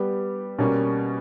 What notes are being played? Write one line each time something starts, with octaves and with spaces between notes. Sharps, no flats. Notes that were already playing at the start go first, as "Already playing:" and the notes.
Already playing: G3 B3 G4
B2 G3 A#3 C#4